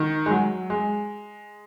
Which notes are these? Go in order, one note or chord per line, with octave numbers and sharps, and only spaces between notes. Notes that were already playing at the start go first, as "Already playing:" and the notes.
Already playing: D#3
G#3
F#3
G#3